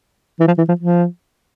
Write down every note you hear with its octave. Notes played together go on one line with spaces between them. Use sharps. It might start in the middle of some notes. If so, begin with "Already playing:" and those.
E3
F3
E3
F3
F3